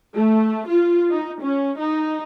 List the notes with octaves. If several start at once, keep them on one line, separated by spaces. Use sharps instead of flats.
A3
F4
D#4
C#4
D#4